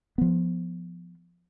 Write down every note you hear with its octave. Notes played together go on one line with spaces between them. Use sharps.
F3 B3